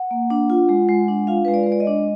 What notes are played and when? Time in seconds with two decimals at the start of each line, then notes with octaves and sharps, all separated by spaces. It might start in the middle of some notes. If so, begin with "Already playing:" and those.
Already playing: F#5
0.11 A#3
0.30 D4
0.50 F4
0.69 G#3
0.89 G#3
1.08 D4
1.27 F4 F5
1.45 G#3 B4
1.54 D5
1.63 G#3 B4
1.72 D5
1.80 D#5
1.87 D4